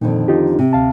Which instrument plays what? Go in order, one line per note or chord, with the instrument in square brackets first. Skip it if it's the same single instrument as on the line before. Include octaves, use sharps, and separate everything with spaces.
[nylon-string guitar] F2 D3 D#3 [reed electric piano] A#2
[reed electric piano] D#4 F4 G4
[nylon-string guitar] C3
[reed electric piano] D2 F5 A5